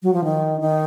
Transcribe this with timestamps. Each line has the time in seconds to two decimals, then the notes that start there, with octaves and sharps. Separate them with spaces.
0.03 F#3
0.14 F3
0.24 D#3
0.61 D#3